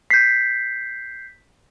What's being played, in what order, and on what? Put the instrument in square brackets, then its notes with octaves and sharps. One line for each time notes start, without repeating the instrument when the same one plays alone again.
[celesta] G6 C7 [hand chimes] B6